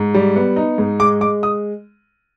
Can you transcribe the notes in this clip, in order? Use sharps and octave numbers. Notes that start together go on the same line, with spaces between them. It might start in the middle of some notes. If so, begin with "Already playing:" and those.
Already playing: G#2
G3
B3
D#4
G#2
G#3 D6
G#3 D6
D#6